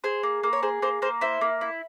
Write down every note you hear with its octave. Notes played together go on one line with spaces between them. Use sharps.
G#4 C5
A#3
A#3
C#5
G#4 C5
A#3 C5
A#3 C5
E4 C5
A#3
E4